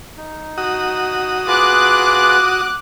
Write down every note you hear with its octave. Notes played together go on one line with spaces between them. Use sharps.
D#4
F#4 D#6
F4 G#4 B4 D6 F#6